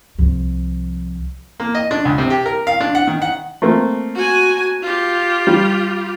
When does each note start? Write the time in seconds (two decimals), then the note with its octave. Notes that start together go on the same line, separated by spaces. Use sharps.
0.19 C2 F3
1.60 A#3
1.75 D#5
1.91 D4
2.05 C#2
2.18 C3
2.30 G4
2.46 A#4
2.67 F5
2.80 D4
2.95 F#5
3.07 D#3
3.22 F#5
3.62 A3 A#3 C4
4.15 F#4 G#5
4.82 F4 G4
5.47 G3